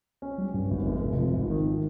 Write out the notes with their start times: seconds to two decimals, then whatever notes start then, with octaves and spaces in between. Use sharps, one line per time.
0.22 C#4
0.38 G3
0.54 G2
0.71 G#1
0.86 F1
1.02 C3
1.18 F3
1.33 G#1
1.50 D#3